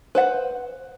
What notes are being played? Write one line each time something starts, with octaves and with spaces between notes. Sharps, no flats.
B4 C5 F#5